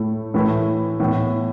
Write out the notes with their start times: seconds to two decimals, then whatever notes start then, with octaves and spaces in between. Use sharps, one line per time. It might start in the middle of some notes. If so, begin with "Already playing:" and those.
Already playing: A2 A3 E4
0.34 A2 E3 A3 E4
1.00 A2 E3 B3